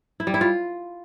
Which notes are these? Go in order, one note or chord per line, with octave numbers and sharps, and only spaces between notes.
E4
G3
E4
F4